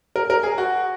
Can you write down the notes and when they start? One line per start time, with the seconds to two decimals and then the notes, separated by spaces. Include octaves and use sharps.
0.16 A#4
0.30 A#4
0.43 G#4
0.58 F#4